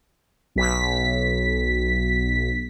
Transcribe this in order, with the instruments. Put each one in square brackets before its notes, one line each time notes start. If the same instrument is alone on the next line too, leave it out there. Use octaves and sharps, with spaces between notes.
[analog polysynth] B1 B6